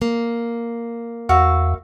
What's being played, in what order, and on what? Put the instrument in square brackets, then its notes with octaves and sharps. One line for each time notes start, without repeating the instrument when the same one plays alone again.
[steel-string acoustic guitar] A#3
[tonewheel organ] E2 [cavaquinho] F#4 E5 F5